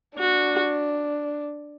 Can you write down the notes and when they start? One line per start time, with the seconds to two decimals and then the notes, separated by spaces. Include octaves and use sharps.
0.18 D4 F#4